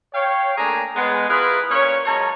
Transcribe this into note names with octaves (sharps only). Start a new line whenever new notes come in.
C#5 F5 G5
A3 A#3 D4 G#4 G#5 A#5
G#3 B3
E4 F4 G#4 A#4 B4
A#2 A#3 C#4 C#5
F#2 G#3 C#4 C#5 A5 A#5